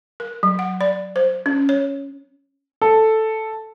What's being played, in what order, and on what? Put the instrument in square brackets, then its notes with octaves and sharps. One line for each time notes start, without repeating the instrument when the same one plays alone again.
[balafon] A#4
F#3
F#5
D5
C5
C#4
C#5
[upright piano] A4